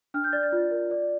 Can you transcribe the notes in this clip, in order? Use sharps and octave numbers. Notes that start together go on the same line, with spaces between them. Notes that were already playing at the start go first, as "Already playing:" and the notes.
D4 F6
G6
D5 A6
A6
F4
A#4
D5